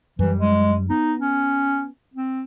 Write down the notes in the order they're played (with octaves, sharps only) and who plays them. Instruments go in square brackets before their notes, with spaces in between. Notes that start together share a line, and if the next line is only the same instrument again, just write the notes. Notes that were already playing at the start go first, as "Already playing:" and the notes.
[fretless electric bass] F#2 G3 [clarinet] E3
[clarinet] G#3
[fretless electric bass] B3 [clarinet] D#4
[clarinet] C#4
C4